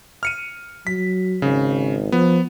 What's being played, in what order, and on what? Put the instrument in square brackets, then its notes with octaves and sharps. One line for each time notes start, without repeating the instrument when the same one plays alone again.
[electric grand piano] F6 C#7 D#7
[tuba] F#3 [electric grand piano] B6
[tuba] G#1 [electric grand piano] C#3
[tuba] F3 [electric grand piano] B3